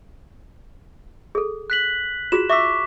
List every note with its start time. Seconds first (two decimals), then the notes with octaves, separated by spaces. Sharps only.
1.35 G#4 A4
1.70 F#6 B6 F#7
2.32 F4 F#4 G#4 E7
2.50 E5 C#6 D6 E6 B6